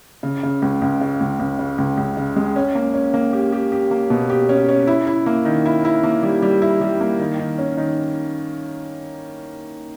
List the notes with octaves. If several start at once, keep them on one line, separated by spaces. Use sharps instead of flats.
C#3
C#3
C#2
C#2
C#3
C#2
C#2
C#3
C#2
C#2
C#3
G#3
C#4
A#3
C#4
A#3
G4
G4
G4
A#3
B2
G4
C#4
C#4
E4
E4
A#3
D#3
E4
E4
A#3
G3
G3
E4
G3
A#3
D#3
D#3
C#4
D#3